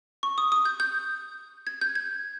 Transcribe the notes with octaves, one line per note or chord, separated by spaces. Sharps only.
C#6
D#6
D#6
G6
G6
G#6
G6
G#6